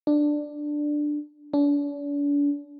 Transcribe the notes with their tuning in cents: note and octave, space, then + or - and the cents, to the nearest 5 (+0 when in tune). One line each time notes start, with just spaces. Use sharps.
D4 +10
D4 -40